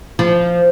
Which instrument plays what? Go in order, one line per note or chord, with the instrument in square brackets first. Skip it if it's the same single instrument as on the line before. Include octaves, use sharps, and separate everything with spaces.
[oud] F3